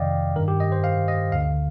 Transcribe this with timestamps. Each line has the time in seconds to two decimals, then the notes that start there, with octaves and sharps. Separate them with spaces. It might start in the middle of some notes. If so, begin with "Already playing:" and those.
Already playing: F2 C3 D#3 D5 D#5 F5 G5
0.36 G2 D#3 A#4
0.48 G4
0.60 D#5
0.72 C5
0.84 F5
1.08 D#5
1.32 D2 D3 F5